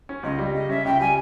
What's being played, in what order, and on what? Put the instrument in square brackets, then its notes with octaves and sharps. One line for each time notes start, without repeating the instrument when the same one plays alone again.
[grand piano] C#4
[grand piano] C#2 [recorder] D#5
[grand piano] G3
[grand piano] C#3 [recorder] D#5
[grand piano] C#4 [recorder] E5
[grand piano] C#2 [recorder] G5
[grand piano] G3 [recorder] G#5